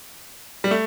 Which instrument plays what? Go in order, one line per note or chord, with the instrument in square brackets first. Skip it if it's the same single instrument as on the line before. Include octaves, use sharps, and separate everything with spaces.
[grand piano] G3
A3